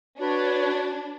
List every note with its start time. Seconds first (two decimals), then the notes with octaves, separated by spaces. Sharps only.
0.19 D4 F#4 B4 C#5